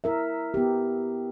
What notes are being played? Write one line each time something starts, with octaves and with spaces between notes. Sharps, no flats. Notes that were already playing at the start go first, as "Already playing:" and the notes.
E4 A#4 E5
B3 G4